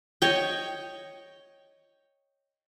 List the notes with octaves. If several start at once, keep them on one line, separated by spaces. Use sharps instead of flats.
C#5 D#5 G5